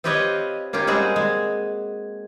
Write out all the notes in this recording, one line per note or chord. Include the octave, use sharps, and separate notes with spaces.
C4 F4 G4 B4 C#5 D#5
A#3 C#4 F4 G4
G3 G#3 C4 F#4 G#4
G#3